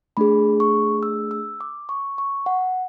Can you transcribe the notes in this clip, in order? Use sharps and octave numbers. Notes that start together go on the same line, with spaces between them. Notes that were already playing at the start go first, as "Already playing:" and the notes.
A3 D4 G#4 B5
C#6
E6
E6
D6
C#6
C#6
F#5